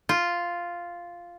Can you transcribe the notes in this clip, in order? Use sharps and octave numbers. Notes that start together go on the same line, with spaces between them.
F4